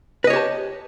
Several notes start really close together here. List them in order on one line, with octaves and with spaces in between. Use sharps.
B4 D#5 C#5 G4 A5